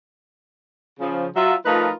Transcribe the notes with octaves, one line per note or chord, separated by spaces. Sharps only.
C#3 F3
F#3 F4 E5
F3 A3 D#4 F4 A#4 B4